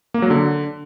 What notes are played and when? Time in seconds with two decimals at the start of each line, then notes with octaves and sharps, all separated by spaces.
0.14 A#3
0.22 F#3
0.30 D3